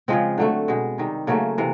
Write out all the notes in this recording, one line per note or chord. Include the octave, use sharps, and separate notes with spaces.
C#3 F3 G#3 C4
D3 F#3 A3
B2 G#3
C3 D#3 G3
C#3 F#3 A3 A#3
C3 E3